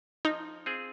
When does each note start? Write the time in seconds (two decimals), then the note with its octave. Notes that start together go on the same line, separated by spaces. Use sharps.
0.25 F3 D#4
0.66 C4 F4 G#4